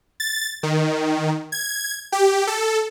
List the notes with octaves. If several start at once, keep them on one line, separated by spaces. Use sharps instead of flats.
A6
D#3
G#6
G4
A4